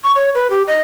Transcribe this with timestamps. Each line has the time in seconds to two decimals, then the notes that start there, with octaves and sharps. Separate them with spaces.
0.04 C#6
0.15 C#5
0.35 B4
0.50 G4
0.67 D#5